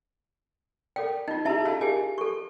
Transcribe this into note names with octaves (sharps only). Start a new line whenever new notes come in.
A4 A#4 D5 G5
D#4 F4 D#5
C#4 E4 G4 G#4 E5 A5
F4 A4 D#5 F5 A5
G4 G#4 A#4 G#5
A4 C#6